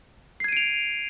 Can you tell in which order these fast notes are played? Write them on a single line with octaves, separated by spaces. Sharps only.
C7 G#6 D#7 D7 F7